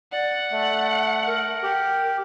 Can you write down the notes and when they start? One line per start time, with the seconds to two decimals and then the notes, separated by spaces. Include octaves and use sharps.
0.12 D5 F#5
0.52 A3
1.26 A#4
1.63 G4